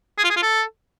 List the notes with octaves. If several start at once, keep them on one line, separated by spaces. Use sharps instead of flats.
G#4
F4
G#4
F4
A4